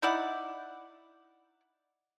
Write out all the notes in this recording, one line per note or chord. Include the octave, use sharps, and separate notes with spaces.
D#4 E4 D5 F#5